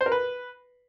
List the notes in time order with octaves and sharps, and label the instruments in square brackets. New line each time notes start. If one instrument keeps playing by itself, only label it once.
[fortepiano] C5
A#4
B4